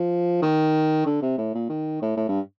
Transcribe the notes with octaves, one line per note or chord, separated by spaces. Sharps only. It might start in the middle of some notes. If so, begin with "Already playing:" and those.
Already playing: F3
D#3
D3
C3
A2
A#2
D#3
A2
A2
G2